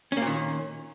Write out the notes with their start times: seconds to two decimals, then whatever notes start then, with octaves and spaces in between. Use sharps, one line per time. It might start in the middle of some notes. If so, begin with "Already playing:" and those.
0.12 C#4
0.17 A#3
0.22 A#2
0.27 D#3